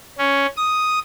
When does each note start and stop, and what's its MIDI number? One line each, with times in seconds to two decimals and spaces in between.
0.18 0.46 61
0.57 1.00 87